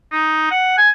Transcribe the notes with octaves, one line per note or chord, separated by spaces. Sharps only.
D#4
F#5
G#5